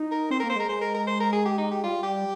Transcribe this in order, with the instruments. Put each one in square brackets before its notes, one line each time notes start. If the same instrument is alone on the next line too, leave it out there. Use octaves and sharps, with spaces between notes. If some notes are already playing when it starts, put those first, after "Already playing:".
Already playing: [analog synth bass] D#4
[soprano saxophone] A#4
[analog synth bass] C4 [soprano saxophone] C5
[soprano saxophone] A#4
[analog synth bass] A#3
[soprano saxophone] C5
[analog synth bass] G#3 [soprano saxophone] A#4
[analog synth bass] G#3 [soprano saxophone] C5
[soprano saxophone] A#4
A#4
C5
A#4
G#4
G4
D#4
G4
[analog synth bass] G3 [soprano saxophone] F4
[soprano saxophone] G4